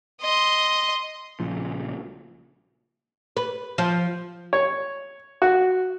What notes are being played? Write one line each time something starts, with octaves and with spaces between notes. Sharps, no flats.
D#5 C6
A#1 A#2 C#3 F3
B4
F3
C#5
F#4